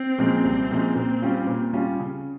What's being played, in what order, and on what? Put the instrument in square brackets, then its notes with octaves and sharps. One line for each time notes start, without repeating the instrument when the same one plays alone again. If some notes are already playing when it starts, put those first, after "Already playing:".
Already playing: [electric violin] C4
[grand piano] A#2 F3 G#3 C#4
C2
A#2 F3 G#3 C#4
[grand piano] A#2 [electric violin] C4
[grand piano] G3 C#4 F4
A#2
G3 C#4 F4
C#3